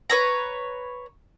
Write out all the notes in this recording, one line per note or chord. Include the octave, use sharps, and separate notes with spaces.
B4 C#5 A#5